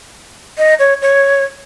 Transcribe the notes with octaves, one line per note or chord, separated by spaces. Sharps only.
D#5
C#5
C#5